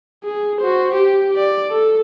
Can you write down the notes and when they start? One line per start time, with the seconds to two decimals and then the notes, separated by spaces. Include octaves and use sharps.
0.24 G#4
0.61 F#4 C5
0.94 G4
1.36 D5
1.71 A4